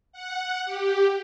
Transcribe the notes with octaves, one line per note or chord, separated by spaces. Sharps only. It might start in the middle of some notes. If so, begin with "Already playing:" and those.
F#5
G4